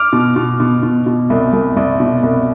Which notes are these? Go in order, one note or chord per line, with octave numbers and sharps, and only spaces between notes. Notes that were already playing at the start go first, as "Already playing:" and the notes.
Already playing: D6 F6
B2
B2
B2
B2
B2
C2
C2
C2
B2
C2